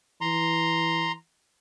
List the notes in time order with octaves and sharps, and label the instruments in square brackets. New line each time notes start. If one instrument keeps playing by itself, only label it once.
[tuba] E3 [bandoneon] A#5 C6